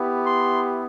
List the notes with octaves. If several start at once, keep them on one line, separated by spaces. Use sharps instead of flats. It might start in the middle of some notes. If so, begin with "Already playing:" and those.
Already playing: B3 E4 G4
C6